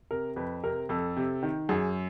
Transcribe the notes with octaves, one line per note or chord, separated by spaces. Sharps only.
C3 A#4
F2 B4
C3 A#4
F2 A4
C3
D#3
F#2 G#4